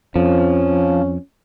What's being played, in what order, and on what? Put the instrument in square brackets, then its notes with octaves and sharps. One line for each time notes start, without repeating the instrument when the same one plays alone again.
[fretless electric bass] F2 [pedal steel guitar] F3 [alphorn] C#4